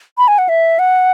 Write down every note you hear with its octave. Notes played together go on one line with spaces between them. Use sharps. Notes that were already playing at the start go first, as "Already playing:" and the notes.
B5
G#5
F#5
E5
F#5